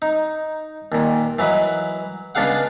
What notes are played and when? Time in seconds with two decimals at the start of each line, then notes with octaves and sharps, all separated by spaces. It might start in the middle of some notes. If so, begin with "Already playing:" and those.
0.02 D#4
0.92 D#2 A#2
1.39 E3 F#3 B4 D#5
2.35 C#2 B3 D4 G#4 F5 F#5